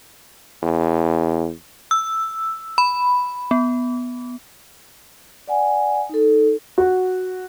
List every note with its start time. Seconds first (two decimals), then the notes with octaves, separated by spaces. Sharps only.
0.63 E2
1.91 E6
2.78 B5
3.51 B3
5.47 D5 F#5 G#5
6.09 D#4 A4
6.78 F#4